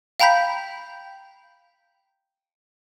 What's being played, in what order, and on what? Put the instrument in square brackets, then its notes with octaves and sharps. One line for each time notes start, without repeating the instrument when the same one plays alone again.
[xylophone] F5 G5 A#5 B5 G6 B6